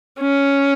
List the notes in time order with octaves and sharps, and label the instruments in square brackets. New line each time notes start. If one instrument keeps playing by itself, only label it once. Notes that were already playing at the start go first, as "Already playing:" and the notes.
[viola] C#4